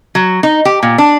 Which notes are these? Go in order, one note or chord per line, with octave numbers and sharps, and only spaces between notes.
F#3
D#4
G4
A#2
D4